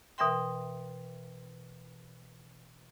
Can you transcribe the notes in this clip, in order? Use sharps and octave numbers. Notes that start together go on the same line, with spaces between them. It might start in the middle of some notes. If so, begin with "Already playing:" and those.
B2 E3 A#4 E5 G5 C6